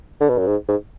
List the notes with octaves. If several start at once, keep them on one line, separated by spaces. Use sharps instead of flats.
D3
B2
F#2
G#2
G#2